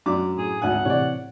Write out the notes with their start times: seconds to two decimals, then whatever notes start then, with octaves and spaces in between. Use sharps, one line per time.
0.06 F#2 D4 D6
0.38 A2 G#4
0.62 G#1 D2 F#5 G#5
0.85 A2 C3 E3 C#5 D5